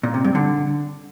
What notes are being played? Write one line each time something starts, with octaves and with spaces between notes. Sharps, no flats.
A#2
C3
G2
D3